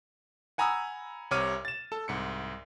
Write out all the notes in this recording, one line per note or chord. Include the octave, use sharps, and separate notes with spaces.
F#5 G#5 A#5 B5 D#6 E6
C2 C3 C#5 D6 F6 D#7
A6 E7
A4 A5
C2 G#2 C#7